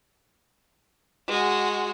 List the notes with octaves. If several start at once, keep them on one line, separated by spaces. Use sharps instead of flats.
G#3 F#4